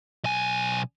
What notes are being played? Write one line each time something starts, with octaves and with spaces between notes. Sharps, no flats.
B1 G#5